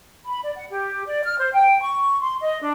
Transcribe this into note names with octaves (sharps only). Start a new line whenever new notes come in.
B5
D5
F#5
G4
D5
F6
C5
G5
C#6
C6
D#5
D4